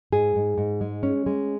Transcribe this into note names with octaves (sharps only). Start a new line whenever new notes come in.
G#2 G#4
G#2
G#2
G#3
C#4
G#3